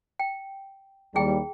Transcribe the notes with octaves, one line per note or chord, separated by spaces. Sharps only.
G5
D#2 G3 E4 G#4 G5